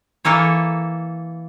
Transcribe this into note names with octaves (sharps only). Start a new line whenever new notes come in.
E3 A#3 A4 C#5